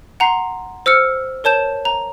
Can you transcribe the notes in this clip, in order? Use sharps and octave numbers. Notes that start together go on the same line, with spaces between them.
F#5 A#5 C6 C7
C5 E6 F6 C#7
A#4 C#5 A5 G6 E7
A#5